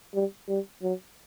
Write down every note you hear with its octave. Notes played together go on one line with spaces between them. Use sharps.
G3
G3
F#3